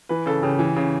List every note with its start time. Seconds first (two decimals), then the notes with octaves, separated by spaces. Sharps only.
0.09 E3 B4
0.26 C#3 A4
0.42 C#3 G4
0.59 E3
0.76 C#3